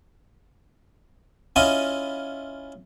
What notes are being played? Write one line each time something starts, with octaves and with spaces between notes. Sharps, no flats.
C#4 E4 F4 D#5